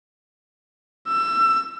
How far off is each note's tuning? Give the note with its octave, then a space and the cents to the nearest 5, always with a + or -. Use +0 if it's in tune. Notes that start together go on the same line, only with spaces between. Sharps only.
E6 +25